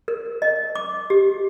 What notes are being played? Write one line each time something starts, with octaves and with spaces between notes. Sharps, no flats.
A#4
D#5
D6
G4